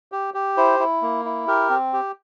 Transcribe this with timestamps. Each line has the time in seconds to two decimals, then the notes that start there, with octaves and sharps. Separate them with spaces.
0.12 G4
0.34 G4
0.57 E4 C5
0.79 E4
1.02 A#3
1.25 E4
1.47 G4 A#4
1.70 C4
1.93 G4